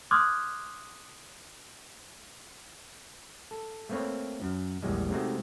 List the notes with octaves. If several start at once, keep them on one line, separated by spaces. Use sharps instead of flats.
C6 D6 D#6 F6 F#6 G#6
A4
A3 A#3 C4 B4 C#5
F#2
A#1 E2 G3 G#3
C3 G#3 A3 C4 D#4 F#4